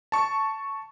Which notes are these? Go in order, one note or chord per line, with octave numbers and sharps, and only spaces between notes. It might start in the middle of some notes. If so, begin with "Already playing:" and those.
A5 C#6